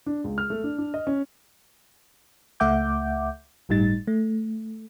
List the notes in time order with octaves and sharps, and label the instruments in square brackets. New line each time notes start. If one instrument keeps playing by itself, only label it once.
[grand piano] D4
C#2
F6
A3
D4
D4
D#5
C#4
[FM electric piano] C#2 A3 E5 F#5 D6 G6
G1 A2 G3 D#4 A6
A3